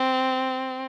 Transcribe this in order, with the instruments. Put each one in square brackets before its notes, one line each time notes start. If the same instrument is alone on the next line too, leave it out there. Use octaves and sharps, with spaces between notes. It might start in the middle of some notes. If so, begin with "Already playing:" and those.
Already playing: [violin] C4